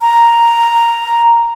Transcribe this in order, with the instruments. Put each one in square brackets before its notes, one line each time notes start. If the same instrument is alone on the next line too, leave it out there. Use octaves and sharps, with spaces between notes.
[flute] A#5